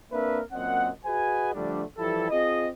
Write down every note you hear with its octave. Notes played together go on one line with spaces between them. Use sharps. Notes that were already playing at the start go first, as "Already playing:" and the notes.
A#3 C4 D4 A#4 B4 E5
F#2 A#2 C4 D#5 F#5
F#4 G#4 B4 D#5 G#5
D3 F3 G3 A3 D4
E3 F3 G3 E4 G4 A4
C4 F4 G#4 D#5